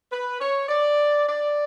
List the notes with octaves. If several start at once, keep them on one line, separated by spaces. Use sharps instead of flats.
B4
C#5
D5
D5